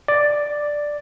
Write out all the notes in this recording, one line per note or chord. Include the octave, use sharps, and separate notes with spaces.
D5